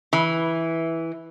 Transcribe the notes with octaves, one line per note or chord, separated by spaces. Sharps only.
E3